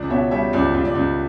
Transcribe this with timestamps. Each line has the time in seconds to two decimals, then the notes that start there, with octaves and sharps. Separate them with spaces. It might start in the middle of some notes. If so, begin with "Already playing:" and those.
Already playing: C#2 C#3 D5
0.10 B2 C#5 E5
0.31 G3 C#5 E5
0.53 C#2 D5
0.74 C#2
0.85 D5
0.95 C#2